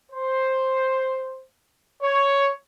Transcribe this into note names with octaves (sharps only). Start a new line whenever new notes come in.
C5
C#5